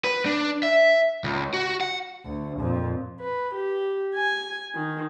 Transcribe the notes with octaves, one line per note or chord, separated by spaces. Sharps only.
B4
D4
E5
C#2
F#4
F#5
D2
F2 A#2
B4
G4
G#5
D#3